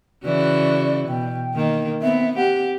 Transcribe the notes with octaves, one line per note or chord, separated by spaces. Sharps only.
C#3 E3 F#4 D5
B2 G5
D#3 A#3
B3 C4 E5
C4 G4 F#5